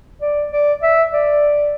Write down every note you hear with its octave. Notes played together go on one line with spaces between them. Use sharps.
D5
D5
E5
D5